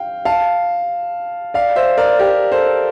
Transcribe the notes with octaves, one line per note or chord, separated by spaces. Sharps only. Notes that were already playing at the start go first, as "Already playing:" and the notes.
Already playing: F5 G5
F5 A5
D5 F5
C5 E5
A#4 D5
G4 A#4
A4 C5